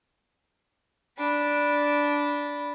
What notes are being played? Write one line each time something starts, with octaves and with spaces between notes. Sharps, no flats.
D4 B5